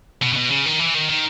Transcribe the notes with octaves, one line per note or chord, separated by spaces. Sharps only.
B2
C#3
B2
C#3
D#3
E3
D#3
D#3